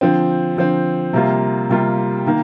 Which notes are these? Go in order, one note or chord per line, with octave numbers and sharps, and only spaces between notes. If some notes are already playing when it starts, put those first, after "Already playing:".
D3 F3 C4
D3 F3 C4
C3 G3 A#3 F4
C3 G3 A#3 F4
D#3 A#3